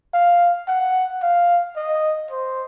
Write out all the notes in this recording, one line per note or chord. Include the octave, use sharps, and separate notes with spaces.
F5
F#5
F5
D#5
C5